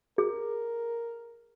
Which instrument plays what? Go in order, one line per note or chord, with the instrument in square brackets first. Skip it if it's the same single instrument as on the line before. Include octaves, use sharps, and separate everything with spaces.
[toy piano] G#4 [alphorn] A#4